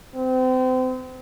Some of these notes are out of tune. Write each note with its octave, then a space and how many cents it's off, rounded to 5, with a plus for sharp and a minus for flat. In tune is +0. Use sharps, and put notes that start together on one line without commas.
C4 -35